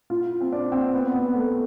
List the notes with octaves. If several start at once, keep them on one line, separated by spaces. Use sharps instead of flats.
F4
C4
D4
C4
B3
B3
A3